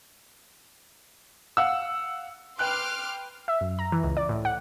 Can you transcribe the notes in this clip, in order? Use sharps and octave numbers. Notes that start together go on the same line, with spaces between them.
F5 F#5 E6
B4 G5 C6 D6 F6 F#6
E5
F#2
A#5
E3
C#2
D5
A2
F#5